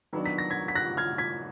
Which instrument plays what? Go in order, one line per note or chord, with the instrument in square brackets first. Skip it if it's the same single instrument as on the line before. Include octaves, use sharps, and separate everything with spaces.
[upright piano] D#3 F#3 B3 D4 F#4
[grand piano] B6
A#6
G#6 B6
B6
F#6 A#6
F6 G#6
G#6 B6